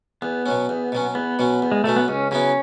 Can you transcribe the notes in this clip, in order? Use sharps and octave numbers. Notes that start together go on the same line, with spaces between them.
E2 B3
B2 F#3 C#4
E2
B2 F#3 C#4
E2 B3
B2 F#3 C#4
E2
G#3
B2 F#3 A3 C#4
B3
C#2 C#4
C#3 F#3 B3 C#4 E4